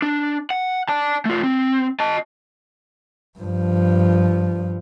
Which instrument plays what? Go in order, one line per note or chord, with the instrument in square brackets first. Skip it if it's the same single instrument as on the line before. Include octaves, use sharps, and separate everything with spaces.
[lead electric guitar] D4
F#5
D5 A5
A3 F4
C4
D#5 A5
[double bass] G2 F3